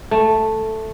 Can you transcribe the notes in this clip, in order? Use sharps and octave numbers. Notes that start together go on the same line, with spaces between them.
A3